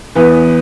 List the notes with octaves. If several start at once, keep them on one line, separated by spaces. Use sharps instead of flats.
E2 E3 B3 B4